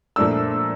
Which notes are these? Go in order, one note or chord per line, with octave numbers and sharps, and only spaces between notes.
A#2 F3 A3 D4 E6